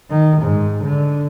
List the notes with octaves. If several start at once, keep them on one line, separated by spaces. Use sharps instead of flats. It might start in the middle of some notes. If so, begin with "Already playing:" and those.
D#3
G#2
D3